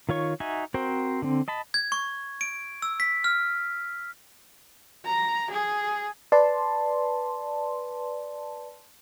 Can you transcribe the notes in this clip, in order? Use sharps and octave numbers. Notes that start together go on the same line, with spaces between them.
D#3 F4 C#5 C#6
D#4 F#4 E5 G#5
C4 F#4 A#4 C5 G5
D3 C4
D#5 A5 B5
G#6
C#6
D7
E6
B6
F6
A#5
G#4
B4 D5 A5 C6